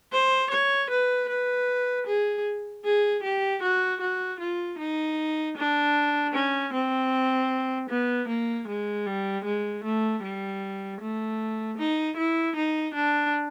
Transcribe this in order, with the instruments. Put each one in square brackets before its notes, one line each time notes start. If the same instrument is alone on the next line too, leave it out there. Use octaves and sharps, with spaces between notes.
[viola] C5
C#5
B4
B4
G#4
G#4
G4
F#4
F#4
F4
D#4
D4
C#4
C4
B3
A#3
G#3
G3
G#3
A3
G3
A3
D#4
E4
D#4
D4